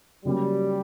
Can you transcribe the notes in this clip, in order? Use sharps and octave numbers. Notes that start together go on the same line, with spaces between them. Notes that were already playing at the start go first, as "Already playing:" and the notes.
C#3 F#3 G3 A#3 C#4 F#4